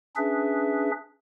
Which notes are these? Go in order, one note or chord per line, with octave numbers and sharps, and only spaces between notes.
C#4 D4 G#4 B4 E5